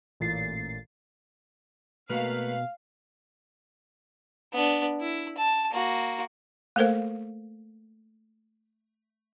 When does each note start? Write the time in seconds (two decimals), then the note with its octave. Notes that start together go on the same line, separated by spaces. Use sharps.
0.20 A1 A#2 A6 C7
2.10 B2 A3 A#3 A#4 B4 F5
4.53 B3 D4
5.01 E4
5.38 A5
5.71 A#3 F#4
6.76 A3 A#3 A4 A#4 C5 F5